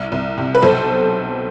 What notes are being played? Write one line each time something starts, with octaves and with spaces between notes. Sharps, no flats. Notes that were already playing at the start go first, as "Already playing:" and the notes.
Already playing: C2
C2
C3
B4
B1 A4 C5